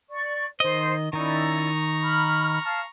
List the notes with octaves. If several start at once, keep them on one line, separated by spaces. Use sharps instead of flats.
D5 C#6
D#3 C5 D#5
D#3 C#4 D#4 E4 D5 A#5 C#6
B5 F6
F5 A5 F6